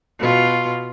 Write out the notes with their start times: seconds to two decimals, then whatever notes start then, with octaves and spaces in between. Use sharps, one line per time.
0.19 B2 F4